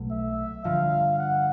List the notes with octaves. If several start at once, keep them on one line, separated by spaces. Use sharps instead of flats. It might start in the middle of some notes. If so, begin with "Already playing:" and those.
Already playing: B1 B2 F#3 A3
E5
G2 D3 F3 F5
F#5